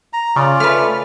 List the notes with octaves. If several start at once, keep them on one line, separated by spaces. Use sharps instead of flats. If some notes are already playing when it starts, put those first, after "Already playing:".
A#5
C#3 C#4 F4 D5
A3 B4 F6